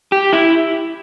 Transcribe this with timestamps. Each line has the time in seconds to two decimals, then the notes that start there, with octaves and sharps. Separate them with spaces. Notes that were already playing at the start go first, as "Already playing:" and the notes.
0.12 G4
0.33 E4